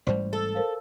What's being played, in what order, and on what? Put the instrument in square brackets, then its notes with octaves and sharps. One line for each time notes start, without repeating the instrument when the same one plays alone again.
[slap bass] A1 G#2 G3 [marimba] C5 D5
[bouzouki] A4
[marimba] A#4 C5 F5